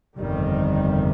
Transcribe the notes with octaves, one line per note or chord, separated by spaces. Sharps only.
G1 F2 C3 D#3 G3